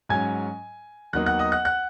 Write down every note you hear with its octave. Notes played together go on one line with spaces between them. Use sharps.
G#2 F#3 C#4 G#5 G#6
D#2 D#3 F#3 B3 D#4 F#5 F#6
F#5 F#6
D#5 D#6
F#5 F#6
F#5 F#6